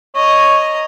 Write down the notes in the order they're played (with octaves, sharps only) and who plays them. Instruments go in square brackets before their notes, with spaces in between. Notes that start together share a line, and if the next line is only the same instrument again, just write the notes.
[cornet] C#5 [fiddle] D#5 A#5